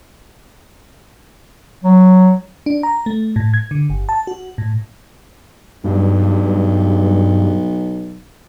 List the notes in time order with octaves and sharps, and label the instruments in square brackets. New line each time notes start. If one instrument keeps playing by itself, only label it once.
[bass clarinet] F#3
[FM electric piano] D4
A#5
A3
A2
G#6
D3
G1
A5
F#4
A2
[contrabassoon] B1 [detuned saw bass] G2